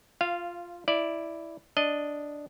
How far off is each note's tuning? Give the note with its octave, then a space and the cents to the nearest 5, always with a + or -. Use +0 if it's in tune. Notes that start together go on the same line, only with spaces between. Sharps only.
F4 +0 F5 -20
E4 +0 D5 +0
D4 +0 D#5 -5